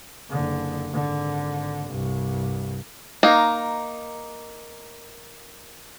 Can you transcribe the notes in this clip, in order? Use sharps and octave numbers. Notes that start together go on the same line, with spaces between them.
F#1 D3
G#1 D3
C2 G2
A#3 D#4